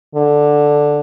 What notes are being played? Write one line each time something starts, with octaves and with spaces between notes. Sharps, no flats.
D3